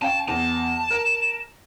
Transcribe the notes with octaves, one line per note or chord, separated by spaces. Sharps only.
C#4 F5 G5 A5
E2 A5
A#4